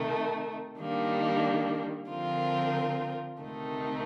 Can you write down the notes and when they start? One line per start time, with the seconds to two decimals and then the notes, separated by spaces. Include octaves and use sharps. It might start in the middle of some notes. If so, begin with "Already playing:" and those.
Already playing: C3 D#3 A3
0.79 D#3 G3 A#3 D4
2.10 D3 F3 C4 F4 A#4
3.40 D2 C3 D#3 A3 D#4